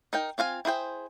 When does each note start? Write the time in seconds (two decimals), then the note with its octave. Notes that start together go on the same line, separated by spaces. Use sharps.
0.13 D#4 A#4 G5
0.38 C4 F4 F5 G#5
0.65 E4 G#4 C5 G5